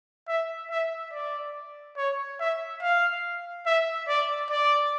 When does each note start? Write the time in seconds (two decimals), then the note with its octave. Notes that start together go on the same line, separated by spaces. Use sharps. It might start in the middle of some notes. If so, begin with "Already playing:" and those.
0.28 E5
0.71 E5
1.13 D5
1.97 C#5
2.40 E5
2.82 F5
3.66 E5
4.08 D5
4.51 D5